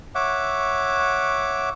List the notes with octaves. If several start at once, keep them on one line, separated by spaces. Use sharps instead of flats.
C#5 E5 F#5 D6